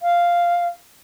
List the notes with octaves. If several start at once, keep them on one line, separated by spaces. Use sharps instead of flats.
F5